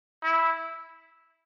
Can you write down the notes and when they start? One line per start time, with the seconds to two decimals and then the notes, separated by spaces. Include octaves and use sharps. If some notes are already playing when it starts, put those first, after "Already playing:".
0.24 E4